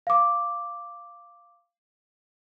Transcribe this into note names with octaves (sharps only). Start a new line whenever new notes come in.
F5 D6